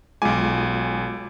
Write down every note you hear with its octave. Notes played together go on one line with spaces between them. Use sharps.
B1 G#3 F4 G#5 D6